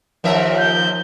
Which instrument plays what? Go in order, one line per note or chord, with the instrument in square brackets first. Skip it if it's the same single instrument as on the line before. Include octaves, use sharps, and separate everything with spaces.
[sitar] D#2 A#4 E5 [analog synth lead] F3
[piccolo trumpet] G6